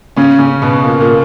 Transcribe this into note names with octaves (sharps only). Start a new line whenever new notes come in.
C#3 C#4
C#3 C#4
B2 B3
A#2 A#3
A#2 A#3